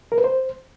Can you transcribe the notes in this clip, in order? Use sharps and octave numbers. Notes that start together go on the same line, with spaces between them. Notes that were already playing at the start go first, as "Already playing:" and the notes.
A#4
B4
C5